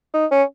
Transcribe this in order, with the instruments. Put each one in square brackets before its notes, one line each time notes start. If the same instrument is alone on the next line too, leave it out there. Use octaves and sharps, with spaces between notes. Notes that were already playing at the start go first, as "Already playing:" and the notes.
[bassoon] D#4
C#4